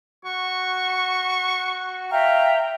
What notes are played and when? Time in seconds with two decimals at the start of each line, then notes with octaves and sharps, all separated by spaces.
0.25 F#4 C#6
2.12 E5 F5 G5 A#5